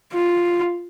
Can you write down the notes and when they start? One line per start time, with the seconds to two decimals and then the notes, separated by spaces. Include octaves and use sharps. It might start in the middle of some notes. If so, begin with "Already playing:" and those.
0.13 F4